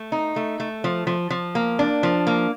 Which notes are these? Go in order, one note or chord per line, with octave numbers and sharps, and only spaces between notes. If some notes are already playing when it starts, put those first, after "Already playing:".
Already playing: A3
D#4
A3
A3
F3
F3
F3
A#3
D4
F3
A#3